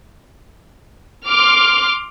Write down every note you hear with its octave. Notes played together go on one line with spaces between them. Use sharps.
C6 D6 F6